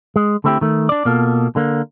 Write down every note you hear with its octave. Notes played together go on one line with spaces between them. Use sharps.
G#3
D3 A3 C4 E4 F4 G4
D#3 A3
D4 D5
B2 A#3 F4 A4
D3 A#3